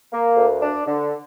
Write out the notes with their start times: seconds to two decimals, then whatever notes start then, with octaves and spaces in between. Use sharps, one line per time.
0.12 A#3
0.36 D2
0.61 D4
0.86 D3